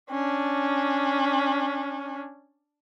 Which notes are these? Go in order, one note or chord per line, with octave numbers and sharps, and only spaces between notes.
C#4 D4